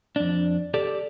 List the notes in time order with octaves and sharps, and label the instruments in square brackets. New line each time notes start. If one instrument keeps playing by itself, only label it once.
[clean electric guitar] F2 D4
G4 A4 D5